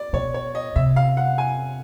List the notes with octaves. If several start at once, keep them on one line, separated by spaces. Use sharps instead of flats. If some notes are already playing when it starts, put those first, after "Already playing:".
Already playing: D5
B2 C#5
C#5
D#5
C3 E5
F5
F#5
G#5